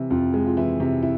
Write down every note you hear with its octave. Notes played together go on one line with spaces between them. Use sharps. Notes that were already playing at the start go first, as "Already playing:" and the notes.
Already playing: C3 E3 E4
F2 F4
G#3
F4
E3 E4
C3
E4